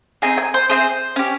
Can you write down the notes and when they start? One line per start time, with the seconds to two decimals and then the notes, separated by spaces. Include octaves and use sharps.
0.22 C4 D#4 G#4 G#5
0.38 G#5
0.54 C5
0.69 C4 D#4 G#4 C5
1.16 C#4 G4